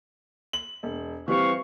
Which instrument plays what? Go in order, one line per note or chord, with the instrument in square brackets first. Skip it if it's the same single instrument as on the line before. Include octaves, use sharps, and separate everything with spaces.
[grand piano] F#7
E1
[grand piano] E3 G3 C4 [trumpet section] F5 C#6